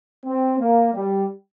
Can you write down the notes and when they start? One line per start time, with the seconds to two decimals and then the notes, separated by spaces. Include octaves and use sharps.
0.24 C4
0.59 A#3
0.94 G3